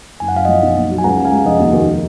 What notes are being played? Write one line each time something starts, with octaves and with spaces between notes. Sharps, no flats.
F#1 G#5
F#5
F#2 F5
F3 D#5 F#5
B1
A#2
F#3
G#5
C#2 F#5 A#5
C#3
F5 G#5
G#3
F1 D#5 F#5
D#2
D#3